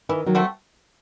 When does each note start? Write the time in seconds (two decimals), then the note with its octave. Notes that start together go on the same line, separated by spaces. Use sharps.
0.09 D#3 E3
0.26 D#3 F#3
0.35 A3 C4 F#4